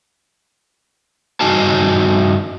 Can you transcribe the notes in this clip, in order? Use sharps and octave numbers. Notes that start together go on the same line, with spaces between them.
G2 D#4 F#4 G#5 A5